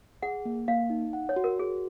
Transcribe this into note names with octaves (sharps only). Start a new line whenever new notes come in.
G#4 F#5
A#3
A#3 F5
D#4
F#5
C#5
F#4
A#4
F#4 G#4